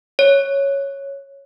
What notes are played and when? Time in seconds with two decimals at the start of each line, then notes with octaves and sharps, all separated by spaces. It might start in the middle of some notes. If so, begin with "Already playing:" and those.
0.19 C#5